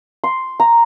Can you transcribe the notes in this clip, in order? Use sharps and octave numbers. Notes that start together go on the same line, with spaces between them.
C6
A#5